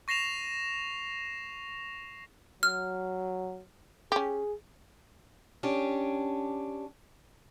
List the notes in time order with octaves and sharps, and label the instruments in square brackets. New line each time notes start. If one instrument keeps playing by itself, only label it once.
[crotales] C#6 A#6 C7 E7 F7
[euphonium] F#3 [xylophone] F6
[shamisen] C#4 G4 [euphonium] G#4
[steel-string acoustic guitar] C#4 D4 G4